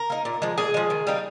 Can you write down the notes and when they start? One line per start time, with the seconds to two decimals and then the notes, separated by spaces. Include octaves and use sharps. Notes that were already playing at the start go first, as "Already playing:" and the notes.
Already playing: A#4
0.10 A#3 D#4
0.25 A#2
0.42 F3 G#3
0.58 A#2 G#4
0.74 F3 G#3
0.90 D#3
1.07 G3 A#3 D#4